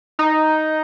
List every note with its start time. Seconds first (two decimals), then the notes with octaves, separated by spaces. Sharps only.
0.19 D#4